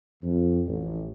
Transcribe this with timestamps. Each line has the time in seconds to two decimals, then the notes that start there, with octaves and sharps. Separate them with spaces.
0.23 F2
0.67 A1